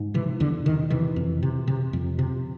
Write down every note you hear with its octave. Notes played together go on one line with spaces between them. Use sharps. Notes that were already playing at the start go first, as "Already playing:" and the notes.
Already playing: G#2
C3 E3
E2 D3
C3 D#3
C3 E3
F2
C3
C3
F2
C3